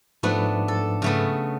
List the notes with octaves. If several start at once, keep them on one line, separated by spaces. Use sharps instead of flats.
G#2 F3 A3 B3 D4 B4
A4
C#3 A3 B3